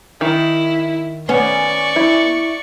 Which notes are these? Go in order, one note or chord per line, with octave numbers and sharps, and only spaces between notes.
D#3 E4
B3 C#4 D5 C#6
E4